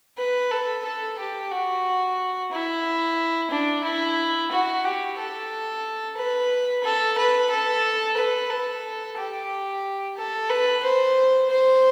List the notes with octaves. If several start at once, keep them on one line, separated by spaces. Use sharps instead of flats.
B4
A4
A4
G4
F#4
E4
D4
E4
F#4
G4
A4
B4
A4
B4
A4
B4
A4
G4
A4
B4
C5
C5